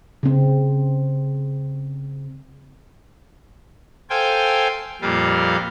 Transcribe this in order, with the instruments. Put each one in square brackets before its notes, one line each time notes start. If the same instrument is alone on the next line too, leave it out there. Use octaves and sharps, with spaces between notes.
[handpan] C#3 C4
[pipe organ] A4 C5 F5 G5 G#5
F2 A#2 G3 F4 F5